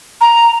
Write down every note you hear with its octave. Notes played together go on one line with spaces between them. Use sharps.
A#5